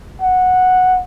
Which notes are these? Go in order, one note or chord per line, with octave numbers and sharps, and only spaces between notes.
F#5